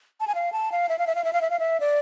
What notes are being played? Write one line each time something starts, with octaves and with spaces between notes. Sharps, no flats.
A5
G#5
F5
A5
F5
E5
F5
E5
F5
E5
F5
E5
F5
E5
D5